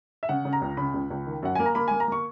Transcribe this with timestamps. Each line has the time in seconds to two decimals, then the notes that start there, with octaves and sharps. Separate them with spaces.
0.23 E5
0.29 C#3 F#5
0.45 C#3
0.53 A#5
0.62 C#2
0.77 C#3 B5
0.94 C#2
1.10 C#2
1.26 D#3
1.43 F#2 F#5
1.55 A#3 G#5
1.66 A#5
1.75 A#3 B5
1.88 A#3 G#5
2.00 A#5
2.08 A#3 C#6